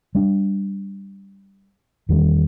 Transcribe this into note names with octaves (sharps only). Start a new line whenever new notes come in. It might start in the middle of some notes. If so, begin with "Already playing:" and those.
G3 D4
E2 D#3 G3